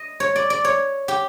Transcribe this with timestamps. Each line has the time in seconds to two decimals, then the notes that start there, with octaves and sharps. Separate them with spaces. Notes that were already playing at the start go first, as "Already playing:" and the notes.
Already playing: D#5
0.20 C#5
0.36 D5
0.50 D5
0.65 C#5
1.08 G4